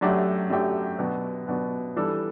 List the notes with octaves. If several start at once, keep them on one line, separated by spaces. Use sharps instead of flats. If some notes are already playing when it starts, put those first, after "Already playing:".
F#2 F#3 A3 D4 G4
F#2 F#3 A3 D4 G4
B2 F#3 B3 D4 F#4
B2 F#3 B3 D4 F#4
E3 G3 D4 A4